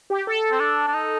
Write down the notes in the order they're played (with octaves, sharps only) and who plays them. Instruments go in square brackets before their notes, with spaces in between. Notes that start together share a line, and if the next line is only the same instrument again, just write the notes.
[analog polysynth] G4
A4
[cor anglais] C4
D4
D4
D#4